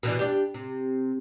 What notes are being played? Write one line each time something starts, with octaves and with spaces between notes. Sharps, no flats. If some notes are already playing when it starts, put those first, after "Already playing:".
B2 E3 D4
D4 G4
C3